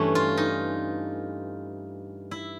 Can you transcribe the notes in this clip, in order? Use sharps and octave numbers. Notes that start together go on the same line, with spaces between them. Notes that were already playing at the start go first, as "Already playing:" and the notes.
Already playing: G2 E3 A3 C#4
F4
D#4
E4